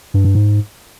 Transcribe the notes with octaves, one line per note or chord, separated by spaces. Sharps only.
G2
G2
G#2